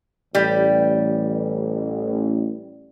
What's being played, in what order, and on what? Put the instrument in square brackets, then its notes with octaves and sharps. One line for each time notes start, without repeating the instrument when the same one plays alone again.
[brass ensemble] A1 [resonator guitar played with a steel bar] G3